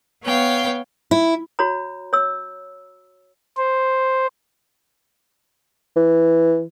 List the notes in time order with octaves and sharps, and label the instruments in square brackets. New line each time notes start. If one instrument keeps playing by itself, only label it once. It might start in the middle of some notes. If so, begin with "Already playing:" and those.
[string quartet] B3 C#5 F5 G5
[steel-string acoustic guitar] E4
[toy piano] F#4 C#5 A#5
C#5 E6
[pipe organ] C5
[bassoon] E3